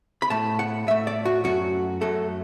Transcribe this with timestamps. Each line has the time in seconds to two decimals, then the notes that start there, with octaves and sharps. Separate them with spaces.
0.22 B5
0.30 A2 A3 A5
0.59 F#5
0.87 A2 A3 E5
1.07 D5
1.25 F#4
1.44 F#2 F#3 A3 F#4
2.01 F#2 F#3 A3 A4